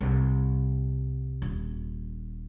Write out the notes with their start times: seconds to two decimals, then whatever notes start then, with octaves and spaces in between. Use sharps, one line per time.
0.01 C2
1.42 D#1